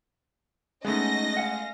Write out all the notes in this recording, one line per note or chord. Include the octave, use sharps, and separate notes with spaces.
G#3 A3 B3 C#4 D#4 D#5 A#6
F5 F#5 G#5